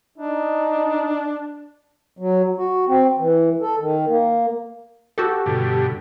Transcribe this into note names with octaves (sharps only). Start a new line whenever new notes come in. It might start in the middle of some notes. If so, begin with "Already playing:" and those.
D4 D#4
F#3
F#4
C4
E3
A4
D#3
A#3
F#4 G4 A4
G2 B2 D3